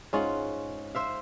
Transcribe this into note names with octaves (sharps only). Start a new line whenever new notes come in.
G#2 C#4 F4 F#5
C5 E5 F5